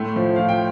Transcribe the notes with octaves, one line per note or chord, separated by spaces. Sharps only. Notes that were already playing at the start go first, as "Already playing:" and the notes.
Already playing: A2 A3 C6
F3
F3 F5
G5